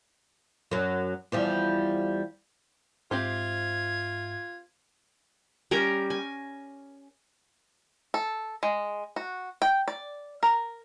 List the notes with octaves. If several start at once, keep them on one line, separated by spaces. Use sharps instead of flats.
F#2 F#3
E2 F3 G3
G#2 C4 F4 G4 C5 E5 G#6
G3 C#4 A#4
G#5
A4
G#3
F#4
G5
D5
A#4